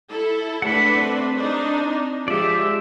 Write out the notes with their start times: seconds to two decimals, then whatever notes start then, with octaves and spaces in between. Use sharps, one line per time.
0.11 E4 A4
0.62 A3 D4 B4 F#5 B5
0.96 C4
1.36 D4 D#4
2.28 F3 G#3 G4 D5 E5